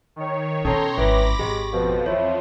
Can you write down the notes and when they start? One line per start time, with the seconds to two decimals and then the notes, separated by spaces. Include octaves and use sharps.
0.16 D#3 C#5
0.65 B2 C#4 A4 C#5 A#5 C6
0.97 G#1 E3 B5 D6 A#6
1.39 G#1 G#3 G4
1.73 F2 B2 F3
2.06 E2 E4 F4 C#5